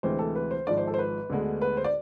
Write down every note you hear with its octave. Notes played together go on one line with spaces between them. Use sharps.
D2 C3 E3 G#3 C5
A4
B4
C5
G#1 G#2 F3 G#3 D5
C5
A4
C5
B4
D2 D3 G#3 B3
B4
C5
D5